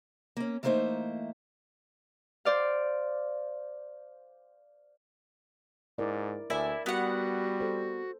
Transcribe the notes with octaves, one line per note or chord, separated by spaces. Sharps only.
A#3 C#4
E3 A3 A#3 D#4 C5 E5
C5 D5 F5
G#2 E4 A#4 D5
D2 E4 A#4 D5 E5 G#5
G3 B3 F#4 F#5
A4 C5